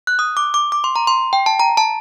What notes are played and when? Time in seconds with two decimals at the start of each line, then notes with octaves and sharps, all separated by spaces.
0.07 F#6
0.19 D#6
0.37 D6
0.54 D6
0.72 D6
0.84 C6
0.96 A#5
1.07 C6
1.33 G5
1.46 A5
1.60 A#5
1.77 A5